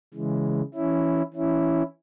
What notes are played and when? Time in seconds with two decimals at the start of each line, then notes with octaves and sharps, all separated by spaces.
0.14 C#3 E3 G#3
0.74 E3 C#4 E4
1.34 E3 C#4 E4